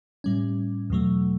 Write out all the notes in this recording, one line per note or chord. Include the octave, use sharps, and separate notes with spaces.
A2 G3 C#4
E2 B2 F#3 A3